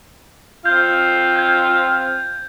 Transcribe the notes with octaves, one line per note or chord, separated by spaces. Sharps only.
C4 F4 F5 G6
G6 G#6